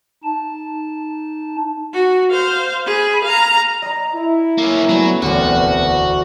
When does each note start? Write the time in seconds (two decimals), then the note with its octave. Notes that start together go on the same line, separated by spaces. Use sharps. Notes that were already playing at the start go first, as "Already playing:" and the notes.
0.24 D#4 A5
1.93 F#4
2.31 C5 F5
2.86 G#4 B5
3.24 F5 A#5
3.82 D#5 A#5
4.14 E4
4.58 A#3 C#4
4.89 F#3 A3 B3 C#4
5.22 E1 D2 B3 C4 F#4 B4